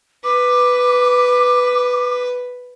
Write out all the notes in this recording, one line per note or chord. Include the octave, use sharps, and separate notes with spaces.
B4 D6